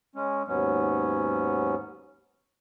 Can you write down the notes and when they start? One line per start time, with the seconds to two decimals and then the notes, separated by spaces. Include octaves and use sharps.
0.15 G#3 C#4
0.48 D#2 G#2 F#3 B3 C#4